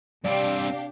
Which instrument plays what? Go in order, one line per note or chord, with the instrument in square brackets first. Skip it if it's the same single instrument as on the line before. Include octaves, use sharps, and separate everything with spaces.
[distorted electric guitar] G2 C4 [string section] C3 D4 G4 [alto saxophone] D5 [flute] F5